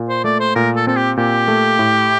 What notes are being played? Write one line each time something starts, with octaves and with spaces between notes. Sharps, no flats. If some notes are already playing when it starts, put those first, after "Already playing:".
Already playing: A#2
C5
A3 D5
C5
A#2 A#4
A4
C4 A4
G4
A#2 G4
A3
A2